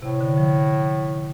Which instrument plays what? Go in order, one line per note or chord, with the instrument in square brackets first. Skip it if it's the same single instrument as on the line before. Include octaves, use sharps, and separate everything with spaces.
[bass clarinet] A2 [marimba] C3
[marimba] D3
F3